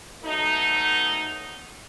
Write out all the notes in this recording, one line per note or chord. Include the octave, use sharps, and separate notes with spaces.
B2 F#3 A3 D#4